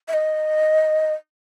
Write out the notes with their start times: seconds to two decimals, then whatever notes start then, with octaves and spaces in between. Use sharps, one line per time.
0.08 E5
0.13 D#5